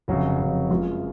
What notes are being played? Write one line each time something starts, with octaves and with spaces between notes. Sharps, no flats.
F1 F2 C#3 F#3 F#4
F1 F2 C#3
F#1 F#2 F3 G#3 F4